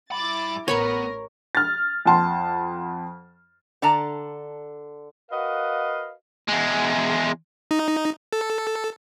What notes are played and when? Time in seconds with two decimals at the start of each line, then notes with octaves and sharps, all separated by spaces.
0.12 G2 E4 B5 D6 A6
0.68 A1 B3 A#4 C#5 B5 C#6
1.55 F6 A6
2.06 F2 F#5 A5 C6
3.82 D3 D5 A5 A#5
5.31 F#4 A#4 B4 D#5 F5
6.49 E2 G#3
7.71 D#4
8.33 A4